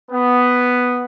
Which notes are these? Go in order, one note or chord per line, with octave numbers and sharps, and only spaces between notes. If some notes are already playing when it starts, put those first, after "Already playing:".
B3